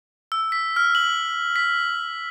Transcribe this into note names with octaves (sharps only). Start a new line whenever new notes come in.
E6
B6
F6
F#7
B6